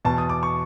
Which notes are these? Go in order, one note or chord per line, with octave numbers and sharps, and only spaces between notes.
E2 B2 A5
D#6
D6
C#6